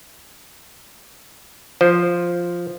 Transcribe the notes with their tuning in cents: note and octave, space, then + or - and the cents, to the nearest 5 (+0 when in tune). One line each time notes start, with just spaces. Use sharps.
F3 +0 C5 +0